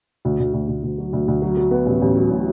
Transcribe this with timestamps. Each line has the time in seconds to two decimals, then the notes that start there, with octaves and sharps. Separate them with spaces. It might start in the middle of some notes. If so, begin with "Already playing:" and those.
0.25 D2
0.40 D2
0.54 D2
0.68 D2
0.83 D2
0.98 F#3
1.13 D2
1.28 D2
1.42 F#3
1.57 F#3
1.71 B3
1.86 A1
2.02 A1
2.15 F#3
2.30 A2